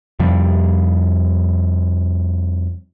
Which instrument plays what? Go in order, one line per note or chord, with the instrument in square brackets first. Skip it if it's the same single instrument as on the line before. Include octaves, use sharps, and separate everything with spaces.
[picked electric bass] F2 C3 F3 G3